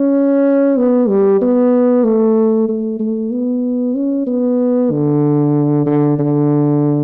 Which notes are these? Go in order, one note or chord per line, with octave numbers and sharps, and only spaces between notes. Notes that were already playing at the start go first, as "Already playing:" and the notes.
Already playing: C#4
B3
G3
B3
A3
A3
A3
B3
C#4
B3
D3
D3
D3